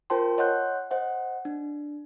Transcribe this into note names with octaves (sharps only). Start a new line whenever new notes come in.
F4 A#4 C5 G5 A5 C6
C#5 D#5 F#5 C6 F#6 G6
C5 D#5 F#5
D4